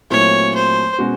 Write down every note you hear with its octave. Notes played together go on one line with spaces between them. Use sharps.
A#2 F#3 A3 C4 E4 C#5
C5
B2 G#3 C#4 F#4